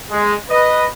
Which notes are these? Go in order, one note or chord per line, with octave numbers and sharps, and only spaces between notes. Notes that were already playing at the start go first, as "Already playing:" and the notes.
G#3
B4 D#5